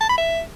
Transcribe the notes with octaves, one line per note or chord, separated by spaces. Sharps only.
A5
B5
E5